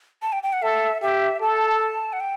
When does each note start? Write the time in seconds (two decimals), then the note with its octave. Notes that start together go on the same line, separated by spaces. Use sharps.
0.22 A5
0.32 G5
0.43 G5
0.53 F#5
0.62 A4 E5
1.02 G4 E5
1.41 A4 A5
2.13 F#5
2.20 G5